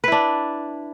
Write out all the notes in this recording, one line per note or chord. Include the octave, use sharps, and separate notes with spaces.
D4 E4 B4